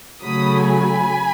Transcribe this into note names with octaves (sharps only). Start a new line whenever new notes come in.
C#3 F#3 A3 B5 D#6
G#5 B5